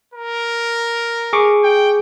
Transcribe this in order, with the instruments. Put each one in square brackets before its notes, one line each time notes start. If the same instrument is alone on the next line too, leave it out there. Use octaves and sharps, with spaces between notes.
[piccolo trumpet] A#4
[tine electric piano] G#4 C#6 D6
[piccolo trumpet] G5